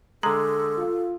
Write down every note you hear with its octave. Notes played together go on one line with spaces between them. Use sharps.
D3 G#3 A4 A#5
F4